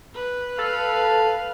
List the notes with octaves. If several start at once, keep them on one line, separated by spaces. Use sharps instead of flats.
B4
A4 F5